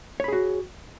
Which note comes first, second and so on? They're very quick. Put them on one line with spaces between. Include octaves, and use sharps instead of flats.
C#5 B5 G#4 F#4